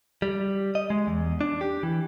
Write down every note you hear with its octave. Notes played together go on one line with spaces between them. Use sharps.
G3
D#5
G#3
E2
D4
G4
E3